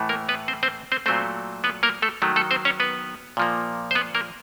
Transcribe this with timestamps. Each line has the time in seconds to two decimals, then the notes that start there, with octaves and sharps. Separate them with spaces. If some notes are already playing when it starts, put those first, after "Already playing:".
Already playing: A2 E3 A3
0.09 A#3 A#4
0.29 B3 B4
0.48 C4 C5
0.63 C4 C5
0.92 C4 C5
1.06 A#2 F#3 A3 C4 C5
1.64 B3 B4
1.83 A#3 A#4
2.02 A3 A4
2.22 D#3 F#3 A3
2.36 A3 A4
2.51 C4 C5
2.65 C#4 C#5
2.80 B3 B4
3.37 A#2 F3 A#3
3.91 C5
3.95 B3 B4
4.15 A#3 A#4